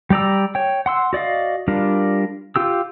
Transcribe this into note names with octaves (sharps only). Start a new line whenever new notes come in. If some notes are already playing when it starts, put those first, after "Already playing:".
G3 G4 D5 A#5 E6
C#5 G5
F#5 C6 E6
F#4 D5 D#5 F5
G3 D4 F4 A#4
F4 G4 E6